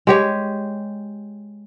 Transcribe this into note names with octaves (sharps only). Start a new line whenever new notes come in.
G#3 G4 C#5